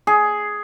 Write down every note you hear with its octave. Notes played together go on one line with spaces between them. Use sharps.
G#4